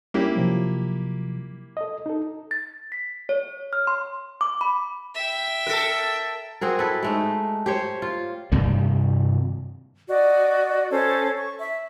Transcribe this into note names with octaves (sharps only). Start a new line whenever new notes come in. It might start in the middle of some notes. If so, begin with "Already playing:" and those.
G3 A#3 C#4 E4 G4
C3 F3 F#3
A4 D#5
D#4 A4
A6
B6
C#5
F6
C6
D6
B5
E5 G5
A4 A#4
C4 F#4 G#4 A#4
E4 A4 B4
G#3 A3 D#4
G4 C5 C#5
F4
G2 C3 D#3 G3
F#4 D5 D#5
C#4 A4 C5 C#5
C#6
E5